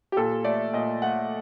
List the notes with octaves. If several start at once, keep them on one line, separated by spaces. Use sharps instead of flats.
G4
A#2 A4
A3 D5
A#2 D#5
A3 F#5